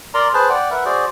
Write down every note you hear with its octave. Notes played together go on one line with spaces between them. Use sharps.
A#4 D5 A#5 C6
G#4 B4 C5 A5
D5 F#5 G5
A#4 B4 E5 F#5
F#4 G#4 C5 D5